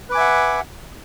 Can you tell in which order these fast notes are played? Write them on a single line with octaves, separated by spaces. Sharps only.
B4 D6 G#5 E5 F#5